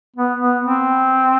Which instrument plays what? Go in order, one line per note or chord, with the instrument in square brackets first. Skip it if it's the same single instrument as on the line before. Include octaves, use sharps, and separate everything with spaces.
[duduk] B3
B3
C4